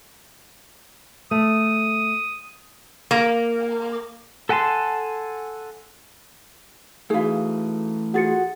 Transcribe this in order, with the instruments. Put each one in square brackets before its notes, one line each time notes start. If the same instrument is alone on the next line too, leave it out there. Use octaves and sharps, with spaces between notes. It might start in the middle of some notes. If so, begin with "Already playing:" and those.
[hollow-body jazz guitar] A3 [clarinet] D#6
[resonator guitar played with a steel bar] A#3
[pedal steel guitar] A4 F#5 G#5 A5 C6
[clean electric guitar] E3 A3 [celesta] D#4 F#4 [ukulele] G#4 F5
[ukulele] F4 G#4 C5 [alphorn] F#4 [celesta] F#5 A6 C#7